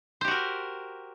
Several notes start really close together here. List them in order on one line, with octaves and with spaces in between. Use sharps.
C5 G4 F#4 A#4